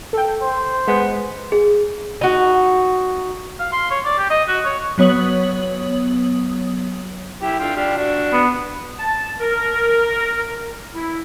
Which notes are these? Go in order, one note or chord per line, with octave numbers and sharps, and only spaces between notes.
A4 G5
C5
G#3 B3
G#4
D#4 F#4
F5
C6
C#5
D5
G4
D#5
F#4
C#5
F#3 B3 C#5 D#6 F#7
E4 G4
D3 F4 G5
D4 F4 G4
D4 F#4
B3
A5
A#4
E4